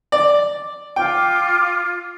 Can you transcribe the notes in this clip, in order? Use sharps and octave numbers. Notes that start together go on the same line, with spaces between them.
D5
F4 G5 D6